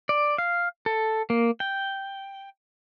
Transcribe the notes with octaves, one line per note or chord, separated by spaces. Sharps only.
D5
F5
A4
A#3
G5